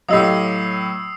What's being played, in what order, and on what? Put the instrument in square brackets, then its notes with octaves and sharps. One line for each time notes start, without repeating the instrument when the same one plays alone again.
[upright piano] A2 F#3 [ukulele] G4 D#5 F5 [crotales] D#6 E6 C7